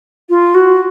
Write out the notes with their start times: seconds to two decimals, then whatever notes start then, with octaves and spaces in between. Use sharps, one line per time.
0.29 F4
0.54 F#4